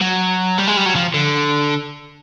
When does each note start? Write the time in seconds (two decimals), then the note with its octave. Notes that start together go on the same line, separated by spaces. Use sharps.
0.01 F#3
0.58 G3
0.67 G#3
0.77 G3
0.86 F#3
0.95 F3
1.14 D3